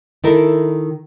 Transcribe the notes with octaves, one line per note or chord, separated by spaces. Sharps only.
D#3 E4 A4 A#4